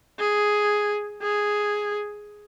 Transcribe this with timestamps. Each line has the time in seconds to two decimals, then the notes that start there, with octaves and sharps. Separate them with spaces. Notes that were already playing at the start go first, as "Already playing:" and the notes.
0.19 G#4
1.22 G#4